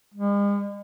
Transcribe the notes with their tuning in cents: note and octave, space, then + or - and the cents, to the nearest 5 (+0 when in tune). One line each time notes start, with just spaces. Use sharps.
G#3 -45